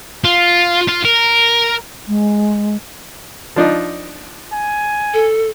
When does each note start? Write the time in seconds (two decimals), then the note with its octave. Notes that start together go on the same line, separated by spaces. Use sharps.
0.24 F4
0.88 F4
1.05 A#4
2.08 G#3
3.56 F3 D4 D#4
4.53 G#5
5.14 A4